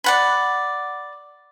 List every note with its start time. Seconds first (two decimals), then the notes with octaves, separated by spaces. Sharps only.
0.04 D5 F#5 B5